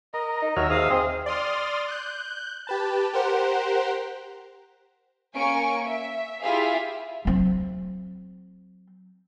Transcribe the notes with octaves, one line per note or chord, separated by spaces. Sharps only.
A#4 D#5
D#4
D#2 F#3 E5 F6
G#2 F5 D#6
C4 G#4 D#5
D5 C6 D#6 F6
F#6 G6
G4 B4 A5
G4 A#4 C5 F#5
A#3 C#4 G#5 C#6 D7
E5
E4 F4 G4 G#4 E5 F5
F#3 C4